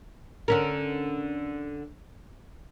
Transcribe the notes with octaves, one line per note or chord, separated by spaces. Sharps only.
D3 C#4 A#4